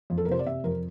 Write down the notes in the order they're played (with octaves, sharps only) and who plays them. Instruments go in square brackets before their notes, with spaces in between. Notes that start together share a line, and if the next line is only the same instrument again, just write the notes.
[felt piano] F2
A4
A#4
C3 C5
D5
C3 E5
F2 A#4